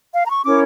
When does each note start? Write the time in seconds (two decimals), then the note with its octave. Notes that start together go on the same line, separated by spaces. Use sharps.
0.13 F5
0.24 A#5
0.29 C#6
0.44 C#4 E4 A#4 C#5 D6